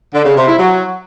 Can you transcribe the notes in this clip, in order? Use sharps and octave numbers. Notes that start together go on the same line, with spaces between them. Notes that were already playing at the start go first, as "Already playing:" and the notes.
D3
C#3
C3
E4
F#3